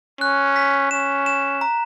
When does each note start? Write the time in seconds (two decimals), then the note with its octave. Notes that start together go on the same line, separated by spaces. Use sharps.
0.21 C#4 F#6
0.56 B6
0.91 C#4 E7
1.26 E7
1.61 A#5